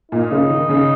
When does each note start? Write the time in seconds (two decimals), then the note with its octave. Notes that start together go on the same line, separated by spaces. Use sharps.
0.11 A#2 D#4
0.31 C#3
0.50 D#3
0.69 C#3